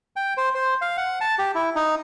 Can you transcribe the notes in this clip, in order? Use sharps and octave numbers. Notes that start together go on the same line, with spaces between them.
G5
C5
C5
F5
F#5
A5
G4
E4
D#4